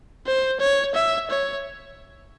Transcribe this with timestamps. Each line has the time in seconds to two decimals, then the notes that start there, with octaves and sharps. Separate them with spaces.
0.27 C5
0.60 C#5
0.95 E5
1.30 C#5